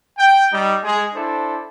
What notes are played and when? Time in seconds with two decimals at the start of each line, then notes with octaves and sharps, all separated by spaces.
0.18 G5
0.53 G3 D#4
0.83 G#3 G#4
1.15 D4 E4 A4 C5